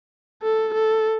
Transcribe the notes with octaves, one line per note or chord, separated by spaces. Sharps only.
A4
A4